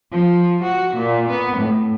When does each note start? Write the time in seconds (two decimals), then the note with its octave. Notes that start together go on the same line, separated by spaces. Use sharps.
0.12 F3
0.64 F#4
0.96 A#2
1.30 B3
1.59 A2